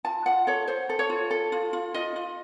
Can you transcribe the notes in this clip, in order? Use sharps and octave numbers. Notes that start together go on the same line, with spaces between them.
F4 A5
F4 F#5
A4 C#5
A4 C5
A4
C#5
F4
A4
F4
F4
F4 D#5
F4